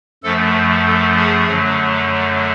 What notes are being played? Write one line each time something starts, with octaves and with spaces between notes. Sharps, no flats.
F#2 F3 A3 A4
A4
G#4
F#2 D3 F#3 A3